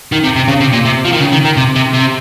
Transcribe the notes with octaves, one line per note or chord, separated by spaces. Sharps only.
D#3
C3
C3
C#3
C3
A#2
C3
F3
D#3
C#3
D#3
D#3
C3
C3
C3